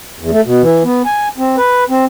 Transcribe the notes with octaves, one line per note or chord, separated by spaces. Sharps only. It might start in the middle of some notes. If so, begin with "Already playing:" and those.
E2
A3
B2
E3
B3
G#5
C4
B4
C4